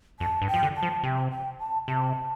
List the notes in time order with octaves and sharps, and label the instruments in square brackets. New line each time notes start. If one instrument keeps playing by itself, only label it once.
[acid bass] F2 [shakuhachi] A5
[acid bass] G2
[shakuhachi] G5
[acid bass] F3
D3
[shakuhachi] A5
[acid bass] F3
[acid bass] C3 [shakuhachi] G5
[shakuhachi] G5
A5
[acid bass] C3 [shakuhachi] A5